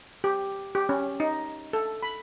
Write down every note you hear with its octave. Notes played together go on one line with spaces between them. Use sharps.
G4
G4
C#4
D#4
A4
B5